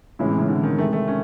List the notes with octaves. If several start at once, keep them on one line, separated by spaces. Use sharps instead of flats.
A2 C#3 E3 G#3 C#4 E4
C3
C#3
D3
D#3
C3 D#3 G#3 A3
A3
C#4